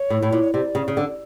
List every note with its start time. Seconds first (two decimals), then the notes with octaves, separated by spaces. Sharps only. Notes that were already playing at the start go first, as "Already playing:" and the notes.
Already playing: C#5
0.10 A2
0.22 A2
0.32 A#2
0.53 C3 D5
0.75 C#3
0.88 C#3
0.97 D3